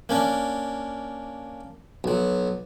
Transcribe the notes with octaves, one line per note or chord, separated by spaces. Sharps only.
A#3 C#4 D4
B1 F#3